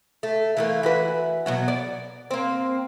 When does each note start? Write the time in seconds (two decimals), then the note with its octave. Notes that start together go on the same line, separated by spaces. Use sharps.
0.23 A3
0.57 E3 A3 A#3
0.83 E3 F#4 B4
1.46 B2 F#3 F#4
1.68 D5
2.31 A#3 C4